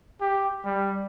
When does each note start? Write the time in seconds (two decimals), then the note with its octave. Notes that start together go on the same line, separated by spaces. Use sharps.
0.21 G4
0.65 G3